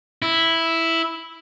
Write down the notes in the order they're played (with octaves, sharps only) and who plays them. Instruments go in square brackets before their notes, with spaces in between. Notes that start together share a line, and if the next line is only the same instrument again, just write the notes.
[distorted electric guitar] E4